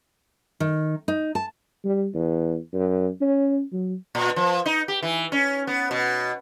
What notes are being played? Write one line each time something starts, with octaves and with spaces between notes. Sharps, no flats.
D#3
D#4
A5
G3
E2
F#2
C#4
F#3
A#2
F3
D#4
G4
E3
C#4
B3
B2